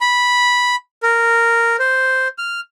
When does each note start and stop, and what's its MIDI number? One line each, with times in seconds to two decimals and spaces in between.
0.01 0.76 83
1.03 1.76 70
1.79 2.28 72
2.38 2.60 89